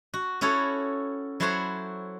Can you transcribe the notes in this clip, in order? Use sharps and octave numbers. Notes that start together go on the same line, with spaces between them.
F#4
C#4 E4 F#4 A4 C#5
F#3 E4 A4 C5 C#5 F#5